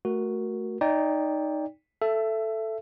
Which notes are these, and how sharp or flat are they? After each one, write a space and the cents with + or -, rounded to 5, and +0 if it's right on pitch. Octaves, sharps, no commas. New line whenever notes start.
A3 +0 F#4 +0 A#4 +0
D#4 -5 D5 -25 G5 +20
A4 +0 E5 +20